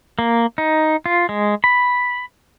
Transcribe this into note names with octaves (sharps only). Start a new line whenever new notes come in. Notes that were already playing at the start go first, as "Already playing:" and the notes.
A#3
D#4
F4
G#3
B5